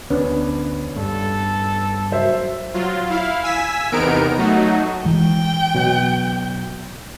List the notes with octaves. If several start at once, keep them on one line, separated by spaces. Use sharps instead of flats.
D2 B3 C#4 D4
G2 A4
F#3 C5 E5
F#3 F4
E4 F5
G#5 E6 B6
E2 C3 B3 D#4 A#4 D7
F#3 A3 D#4 F#4
E3 G#3 G5
B2 F#3 G6